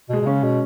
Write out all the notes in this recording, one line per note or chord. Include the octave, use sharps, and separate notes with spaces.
B2
G#3
B2
C#3 C#4
B2